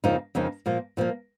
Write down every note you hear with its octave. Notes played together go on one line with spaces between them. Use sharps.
F2 C#3 F3 A#3 D#4
F2 C#3 F3 A#3 D#4
A#2 F3 A#3
A#2 F3 A#3